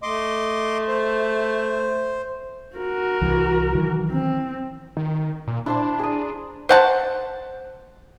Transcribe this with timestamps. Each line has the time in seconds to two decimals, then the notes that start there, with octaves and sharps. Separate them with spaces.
0.03 A3 D#5 C6 D6
0.88 C5
2.77 F#4 A#4
3.21 C2 E3
3.75 D#3 E3 F#3
4.11 C4
4.97 D#3
5.47 A#2
5.66 D4 E4 C5 A5
5.99 G#4 A#5 D#6
6.69 C5 F#5 A5